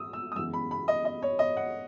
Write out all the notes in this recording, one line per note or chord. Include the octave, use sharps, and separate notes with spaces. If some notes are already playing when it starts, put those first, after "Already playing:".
Already playing: D#6 E6
E6
D#6
F#2 C#3 E3 G#3 B3 E6
B5
B5
D#5
D#5
C#5
D#5
F#5